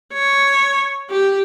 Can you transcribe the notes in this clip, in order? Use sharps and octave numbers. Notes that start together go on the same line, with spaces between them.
C#5
G4